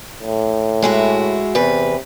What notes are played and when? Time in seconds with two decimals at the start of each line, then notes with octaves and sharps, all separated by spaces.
0.22 A2
0.82 G#3 E4 F#4
1.55 E2 C3 B4